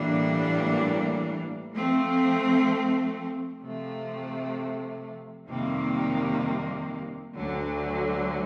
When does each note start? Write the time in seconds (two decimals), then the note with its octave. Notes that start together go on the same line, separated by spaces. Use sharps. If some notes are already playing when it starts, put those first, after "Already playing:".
Already playing: A2 E3 G3 A#3 D4
1.75 F3 A3 C4
3.61 C3 F3 A3
5.48 F2 C3 D#3 G3 A#3
7.34 D2 D3 F#3